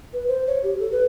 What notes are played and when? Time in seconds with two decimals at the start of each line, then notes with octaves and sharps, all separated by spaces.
0.13 B4
0.28 C5
0.47 C#5
0.63 G4
0.80 A4
0.92 B4